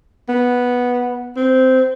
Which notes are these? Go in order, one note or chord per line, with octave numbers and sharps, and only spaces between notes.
B3
C4